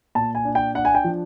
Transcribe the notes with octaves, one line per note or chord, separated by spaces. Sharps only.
A#2 A5
G#5
D4
G5
D4 F#5
G#5
G5
F3